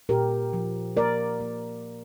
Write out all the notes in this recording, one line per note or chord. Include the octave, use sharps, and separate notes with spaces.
A#2 G4 A#4
F3
A#3 A#4 D5
A#3